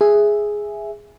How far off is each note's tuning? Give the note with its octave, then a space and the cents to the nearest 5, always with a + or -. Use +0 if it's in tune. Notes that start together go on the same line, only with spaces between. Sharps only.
G#4 +0 E5 +0